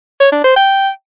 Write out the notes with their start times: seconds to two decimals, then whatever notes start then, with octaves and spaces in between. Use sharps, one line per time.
0.20 C#5
0.32 D4
0.44 C5
0.56 G5